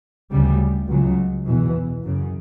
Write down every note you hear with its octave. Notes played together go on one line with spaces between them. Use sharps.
D2 C#3 G3
C#2 C#3 F#3
E2 B2 E3
F#2 C#3